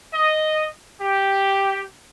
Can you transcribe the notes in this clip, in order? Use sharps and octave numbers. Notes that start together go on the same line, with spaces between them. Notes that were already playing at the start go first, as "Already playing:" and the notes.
D#5
G4